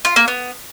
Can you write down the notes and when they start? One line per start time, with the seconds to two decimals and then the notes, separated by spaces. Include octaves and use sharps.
0.05 F4
0.16 A#3
0.28 B3